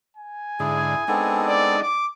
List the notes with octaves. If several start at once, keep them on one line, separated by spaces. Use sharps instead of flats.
G#5
G#2 D3 E4 G#4
G#3 B3 C4 D4 D#4 A4
D5
D6